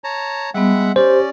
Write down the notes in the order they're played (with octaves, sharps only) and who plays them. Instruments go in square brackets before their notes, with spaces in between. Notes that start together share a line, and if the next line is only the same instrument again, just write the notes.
[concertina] C#5 A5 A#5
[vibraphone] G3 B3 [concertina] G#3 E5 F#5
[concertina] C#4 D5 [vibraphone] G4 [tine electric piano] C5